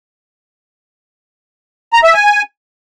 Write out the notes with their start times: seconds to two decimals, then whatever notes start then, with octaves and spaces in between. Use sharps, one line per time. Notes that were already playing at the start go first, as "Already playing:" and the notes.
1.93 A#5
2.04 E5
2.14 G#5